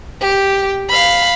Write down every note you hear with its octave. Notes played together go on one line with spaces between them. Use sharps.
G4
F5 B5